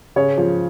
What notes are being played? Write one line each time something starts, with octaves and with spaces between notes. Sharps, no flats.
C#3 C#5
F3